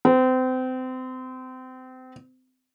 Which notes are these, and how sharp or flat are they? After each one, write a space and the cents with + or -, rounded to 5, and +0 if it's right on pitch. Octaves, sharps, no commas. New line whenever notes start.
C4 -30